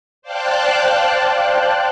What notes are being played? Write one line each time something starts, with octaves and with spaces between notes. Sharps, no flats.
C5 D5 F5 G5 A5 F#6